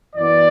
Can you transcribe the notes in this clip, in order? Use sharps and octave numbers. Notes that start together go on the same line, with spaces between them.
F#2 E3 B3 D5